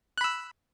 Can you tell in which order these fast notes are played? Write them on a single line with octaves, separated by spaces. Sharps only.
F#6 B5 E6